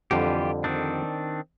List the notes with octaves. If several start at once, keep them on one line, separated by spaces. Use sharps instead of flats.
F2 D3 E3 G3 F4 G4
D#3 C4 D4